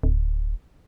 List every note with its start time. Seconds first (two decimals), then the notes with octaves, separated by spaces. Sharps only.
0.03 D1